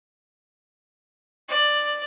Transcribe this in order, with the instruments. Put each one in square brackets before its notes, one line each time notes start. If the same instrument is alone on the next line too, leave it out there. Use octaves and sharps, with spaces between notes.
[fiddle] D5